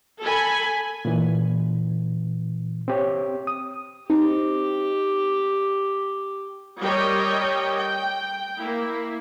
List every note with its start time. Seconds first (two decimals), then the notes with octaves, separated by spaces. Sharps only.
0.24 A4 G#5 B5
1.05 A#2 E3
2.88 C4 G4 C#5
3.47 D#6
4.10 C4 D#4 G4
6.82 G3 G4 A#4 C#5 D#5 G5
7.80 G5
8.60 A#3 E4